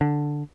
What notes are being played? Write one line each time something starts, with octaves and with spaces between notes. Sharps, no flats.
D3